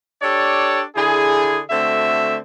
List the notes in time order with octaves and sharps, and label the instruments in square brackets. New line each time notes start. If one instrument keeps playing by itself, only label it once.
[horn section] D4 G4 A4 C#5 D5
D3 E4 G#4
D3 A3 C4 F#4 E5